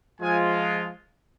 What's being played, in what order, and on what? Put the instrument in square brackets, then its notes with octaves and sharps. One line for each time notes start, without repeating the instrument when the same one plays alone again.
[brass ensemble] F3 G#3 F4 G#5